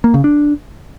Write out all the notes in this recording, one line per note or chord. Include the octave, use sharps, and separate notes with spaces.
A#3
C#3
D4